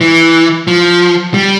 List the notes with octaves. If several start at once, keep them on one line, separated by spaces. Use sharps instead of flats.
E3
F3
G3